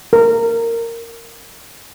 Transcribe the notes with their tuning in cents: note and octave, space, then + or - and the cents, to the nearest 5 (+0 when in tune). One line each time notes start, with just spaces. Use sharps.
A#4 -15